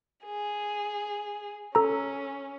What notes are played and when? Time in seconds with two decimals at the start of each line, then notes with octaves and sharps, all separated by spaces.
0.24 G#4
1.75 C#4 A4 A#5